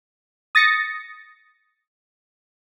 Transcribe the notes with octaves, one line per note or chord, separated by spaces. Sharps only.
D#6 A6 A#6 C#7